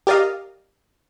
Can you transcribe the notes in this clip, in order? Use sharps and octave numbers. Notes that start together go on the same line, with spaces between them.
G4 A#4 D5 D#5 F5